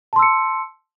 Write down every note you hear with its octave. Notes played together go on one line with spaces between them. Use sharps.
A5 C6 E6 C#7